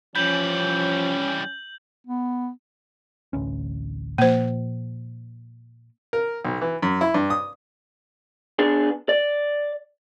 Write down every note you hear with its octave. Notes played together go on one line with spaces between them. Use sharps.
E3 F3 G3 C#4 G6 F#7
B3
A1 D2 C#4
A#2 F3 A#3 C5
A#4
B1
E3
F#2
E4
G2
D#6
B3 D4 G#4
D5